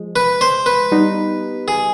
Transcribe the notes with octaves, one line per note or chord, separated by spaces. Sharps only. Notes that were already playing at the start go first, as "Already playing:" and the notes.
Already playing: F3 G#3
B4
C5
B4
G3 B3 D#4
G#4